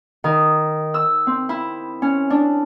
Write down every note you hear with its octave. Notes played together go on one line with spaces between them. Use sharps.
D#3
E6
C4
E4
C#4
D4